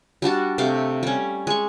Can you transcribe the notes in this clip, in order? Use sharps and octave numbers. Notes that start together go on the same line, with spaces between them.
G3 D4 F#4 A5
C3 A3 F5 D6
G3 C#4
G#3 C#6